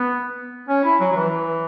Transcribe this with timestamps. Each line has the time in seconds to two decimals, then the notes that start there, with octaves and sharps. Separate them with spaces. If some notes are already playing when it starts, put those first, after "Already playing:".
Already playing: B3
0.69 C#4
0.84 E4
1.00 F#3
1.12 F#3
1.16 E3